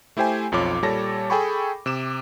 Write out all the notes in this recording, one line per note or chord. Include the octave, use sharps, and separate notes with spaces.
A3 E4 G4 C5 G5 G#5
B1 F2 F4 C#5 D6
A#2 G3 A4 C#5 A5 A#6
G#4 A4 G5 G#5 B5 C#6
C3 D6 E7